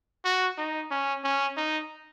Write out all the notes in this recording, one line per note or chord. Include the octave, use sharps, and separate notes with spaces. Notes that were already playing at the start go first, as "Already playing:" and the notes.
F#4
D#4
C#4
C#4
D#4